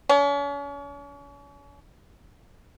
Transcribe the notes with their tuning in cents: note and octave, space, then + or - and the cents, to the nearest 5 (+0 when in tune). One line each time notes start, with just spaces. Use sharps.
C#4 +40 C#5 +40